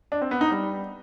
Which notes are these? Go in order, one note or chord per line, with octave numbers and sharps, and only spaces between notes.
D4
C4
B3
D#4
G3